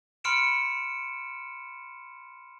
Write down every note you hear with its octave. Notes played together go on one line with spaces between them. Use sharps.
B5 C6 F6 C#7 D7 E7